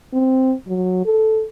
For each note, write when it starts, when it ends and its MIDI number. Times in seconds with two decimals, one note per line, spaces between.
0.13 0.54 60
0.67 1.05 54
1.05 1.44 69